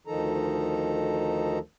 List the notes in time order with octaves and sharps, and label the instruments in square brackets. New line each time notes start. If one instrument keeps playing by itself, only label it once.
[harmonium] D2 D#3 F3 D#4 A4 A#5